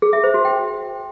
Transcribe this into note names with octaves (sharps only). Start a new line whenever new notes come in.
G#4
E5
C5
F#4
G5